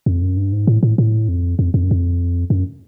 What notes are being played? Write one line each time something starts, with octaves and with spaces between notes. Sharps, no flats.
F2
F#2
G2
G#2
A2
A2
A2
F2
F2
F2
F#2
F2
F#2